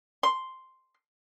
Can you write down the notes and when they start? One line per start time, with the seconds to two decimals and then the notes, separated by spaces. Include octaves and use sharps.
0.23 C6